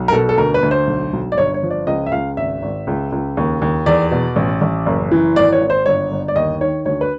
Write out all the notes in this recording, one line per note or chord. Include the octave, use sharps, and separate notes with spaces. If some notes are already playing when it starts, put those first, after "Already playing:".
Already playing: B1
A#4
B2 A4
A4
D2 A#4
B4
D2
C5
B1
B1
D5
G1 C#5
C#5
F3
D5
C#2 D#5
E5
C#2 F5
G#1 E5
G#1
C#2
C#2
D#2
D#2
E2 D5
B2
A1
A1
F#1
E3
G#1 D5
C#5
G#1
C5
G1 C#5
G1
D5
D#2 D#5
D#3 C#5
D2 C#5
B4